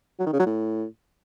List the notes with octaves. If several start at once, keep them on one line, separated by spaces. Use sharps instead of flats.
F#3
D#3
C#3
F#3
A2